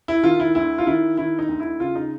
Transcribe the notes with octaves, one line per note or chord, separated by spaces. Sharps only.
E4
D#3 F4
E4
D2 E4
F4
D#3 E4
D#3 E4
D#4
D2
E4
C#3 F4
D#4